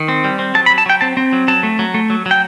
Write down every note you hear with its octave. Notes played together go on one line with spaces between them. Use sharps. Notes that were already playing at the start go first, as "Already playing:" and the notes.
Already playing: D#3
C4
G3
C4
F#3 A5
B5
F#3
A5
F#3 G5
C4 A5
C4
F#3
F#3 A5
A3
F#3
A3
F#3
F#3
G5